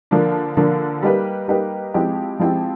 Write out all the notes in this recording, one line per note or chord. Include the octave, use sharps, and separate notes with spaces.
D3 F3 A#3 D4
D3 F3 A#3 D4
G3 A#3 D#4 G4 B4
G3 A#3 D#4 G4 B4
F3 G#3 C4 E4 G4
F3 G#3 C4 E4 G4